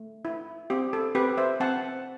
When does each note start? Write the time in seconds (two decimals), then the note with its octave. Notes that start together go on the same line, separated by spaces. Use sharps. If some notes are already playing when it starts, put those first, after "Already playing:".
Already playing: A3
0.25 E4
0.70 C4 G4
0.93 A4
1.15 C4 G4 B4
1.37 C5 E5
1.60 C4 F#5 A5